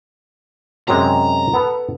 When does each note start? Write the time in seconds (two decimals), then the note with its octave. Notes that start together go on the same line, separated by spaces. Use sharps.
0.88 F#2 C3 G#3 A#5
1.54 B3 A4